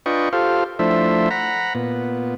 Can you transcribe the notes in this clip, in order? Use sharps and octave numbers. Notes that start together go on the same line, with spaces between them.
D4 F4 B4 D#5 G5 C#6
F4 G4 A4 C5 F5
F3 A3 D4 E4 C5 E5
F#5 A#5 B5
A#2 B3